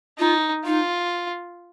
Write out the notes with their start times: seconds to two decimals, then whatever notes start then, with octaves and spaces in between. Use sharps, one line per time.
0.19 D#4 F4
0.65 D#4 F4